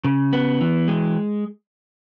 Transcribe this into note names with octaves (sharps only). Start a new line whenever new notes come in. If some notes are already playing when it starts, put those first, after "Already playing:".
C#3
B3
E3
G#3